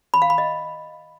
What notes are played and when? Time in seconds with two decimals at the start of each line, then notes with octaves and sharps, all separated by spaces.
0.14 B5
0.22 F5
0.30 B5
0.38 D#5